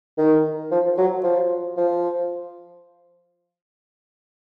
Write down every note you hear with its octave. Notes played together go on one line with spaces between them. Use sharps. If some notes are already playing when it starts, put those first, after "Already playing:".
D#3
F3
F#3
F3
F3